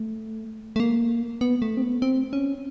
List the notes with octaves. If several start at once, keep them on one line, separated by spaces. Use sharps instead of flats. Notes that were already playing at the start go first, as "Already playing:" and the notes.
Already playing: A3
A3
A#3
B3
A3
C4
B3
C4
C#4